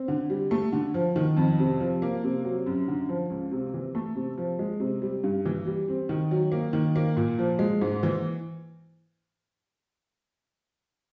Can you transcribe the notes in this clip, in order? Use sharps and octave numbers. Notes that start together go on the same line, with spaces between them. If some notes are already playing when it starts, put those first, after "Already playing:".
Already playing: C4
D3
G3
A3
D3
F3
D#3
F2
C3
F3
A#3
C3
F#3
F#2
D3
F3
C#2
C3
E3
A3
C3
F3
G#3
C3
G3
G2
E3
G3
C4
D#3
F#3
A#3
D#3
A#3
A#2
F3
G#3
G#2
E3